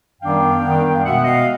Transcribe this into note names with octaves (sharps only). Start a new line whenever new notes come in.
F#2 D#3 G3 B3 D4 F5 G5
F#2 D#3 G3 B3 D4
F5
B2 G#3 B3 E5 F#5
D#5 F5